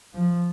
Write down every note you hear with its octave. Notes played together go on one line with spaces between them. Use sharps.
F3